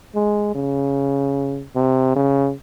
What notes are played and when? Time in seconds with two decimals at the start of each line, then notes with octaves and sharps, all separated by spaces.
0.15 G#3
0.55 C#3
1.76 C3
2.16 C#3